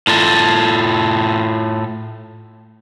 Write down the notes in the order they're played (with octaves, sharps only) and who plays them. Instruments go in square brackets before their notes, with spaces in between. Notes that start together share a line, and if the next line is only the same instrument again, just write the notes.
[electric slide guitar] A2 F4 A4